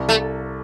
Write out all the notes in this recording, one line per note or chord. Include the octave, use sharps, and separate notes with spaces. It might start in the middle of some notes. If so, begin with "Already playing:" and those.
Already playing: C2
A3